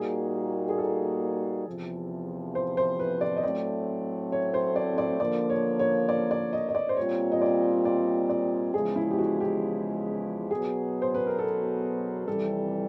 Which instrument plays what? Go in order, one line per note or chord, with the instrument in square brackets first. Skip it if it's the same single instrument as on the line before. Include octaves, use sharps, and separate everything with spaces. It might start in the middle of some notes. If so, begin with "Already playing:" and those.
Already playing: [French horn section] A#2 G3 A#3 D#4 F#4 [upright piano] G#4
[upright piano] G#4
A4
[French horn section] E2 C3 F3
[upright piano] C5
C5
B4
D5
D#5
[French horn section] A2 F#3 A3 C4 [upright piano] D5
[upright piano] C#5
C5
D5
D5
[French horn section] D3 F3 A#3 [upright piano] D5
[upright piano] C#5
C#5
D5
D5
D#5
D#5
D5
C5
[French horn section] A#2 G3 C4 F4 [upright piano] C#5
[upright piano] D#5
D5
D5
D5
[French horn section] E2 C#3 F3 G#3 [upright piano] G#4
[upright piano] E4
G4
F#4
G4
[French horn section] B2 F#3 B3 [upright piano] G#4
[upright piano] C5
B4
A#4
A4
[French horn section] F2 C3 E3 G3 [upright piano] A4